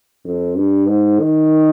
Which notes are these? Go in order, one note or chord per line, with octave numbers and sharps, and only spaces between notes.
F2
G2
G#2
D#3